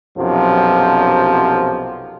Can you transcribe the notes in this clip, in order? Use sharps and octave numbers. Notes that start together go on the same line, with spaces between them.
B1 F#2 C3 F3